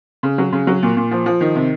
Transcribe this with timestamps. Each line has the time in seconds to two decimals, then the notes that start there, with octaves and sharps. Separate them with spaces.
0.23 C#3
0.38 F#3
0.52 C#3
0.67 F#3
0.83 A#2
0.97 A#2
1.11 F3
1.26 F3
1.41 D#3
1.55 C3